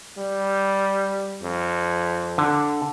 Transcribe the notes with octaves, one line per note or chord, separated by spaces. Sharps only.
G3
F2
D3